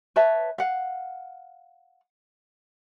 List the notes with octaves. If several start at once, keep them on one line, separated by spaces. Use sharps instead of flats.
B4 C#5 E5 A5
F5 F#5